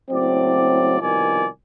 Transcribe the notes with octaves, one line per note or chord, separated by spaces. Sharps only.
F#1 A2 F#3 C4 D5
C2 B2 D#3 F3 D5 G#5